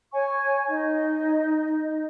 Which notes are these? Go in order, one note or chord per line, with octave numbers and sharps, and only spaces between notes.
C#5 G#5 C#6
D#4 D#5